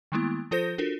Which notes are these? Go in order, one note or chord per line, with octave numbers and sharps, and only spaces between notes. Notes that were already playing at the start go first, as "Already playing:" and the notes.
D#3 G3 G#3 A#3 B3 E4
F3 F4 A4 C5 G6 A#6
D4 F4 F#4 A4 A#4